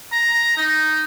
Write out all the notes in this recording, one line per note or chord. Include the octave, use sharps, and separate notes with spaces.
A#5
D#4